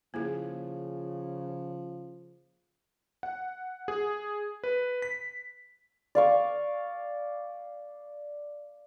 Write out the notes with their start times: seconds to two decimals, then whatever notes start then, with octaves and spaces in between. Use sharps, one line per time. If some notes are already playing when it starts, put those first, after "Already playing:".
0.14 C#3 F3 A#3 E4 G#4
3.23 F#5
3.88 G#4
4.64 B4
5.02 B6
6.15 D5 F5 C#6